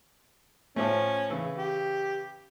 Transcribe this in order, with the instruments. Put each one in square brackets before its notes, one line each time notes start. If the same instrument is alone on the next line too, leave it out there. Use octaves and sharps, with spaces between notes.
[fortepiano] A2 F3 A3 [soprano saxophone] C#4
[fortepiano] C#3 E3
[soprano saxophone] G4